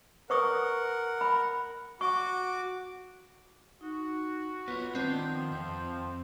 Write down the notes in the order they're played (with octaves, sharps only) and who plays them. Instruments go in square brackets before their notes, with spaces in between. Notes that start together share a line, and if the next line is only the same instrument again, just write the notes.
[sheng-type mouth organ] A#4 F#5 [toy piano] B4 C#6 D#6
[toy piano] B5
[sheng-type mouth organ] F#4 D6 [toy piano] C#6
[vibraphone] D#4 [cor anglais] F#4
[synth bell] B3 [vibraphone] F4 F#5 [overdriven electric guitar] B4 C#5
[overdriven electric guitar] D#3 D#5 [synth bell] C4 [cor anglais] D4
[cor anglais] F3
[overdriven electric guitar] F2 [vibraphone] C5